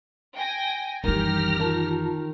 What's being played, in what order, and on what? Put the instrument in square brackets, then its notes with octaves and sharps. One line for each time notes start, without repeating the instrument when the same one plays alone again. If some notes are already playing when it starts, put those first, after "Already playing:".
[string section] G5 G#5 A#6
[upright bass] F#2 E3 [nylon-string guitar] D#3 [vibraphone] G3 [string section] G4 F6 A#6
[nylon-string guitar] D#3 [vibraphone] F4 A5